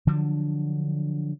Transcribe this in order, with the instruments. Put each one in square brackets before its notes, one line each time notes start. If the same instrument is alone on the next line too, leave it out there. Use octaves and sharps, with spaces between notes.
[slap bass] D3 F3 F#3 D4